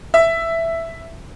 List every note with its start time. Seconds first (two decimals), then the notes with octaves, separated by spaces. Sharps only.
0.14 E5